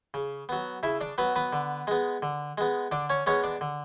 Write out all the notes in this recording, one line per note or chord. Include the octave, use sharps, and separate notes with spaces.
C#3
F#3 B3
C#3 E4 E5
D4 D5
F#3 B3 B4
B3 B4
D3
G#3 B3
D3
G#3 B3
D3 D4 D5
C#4 C#5
G#3 B3 C#4 C#5
D4 D5
D3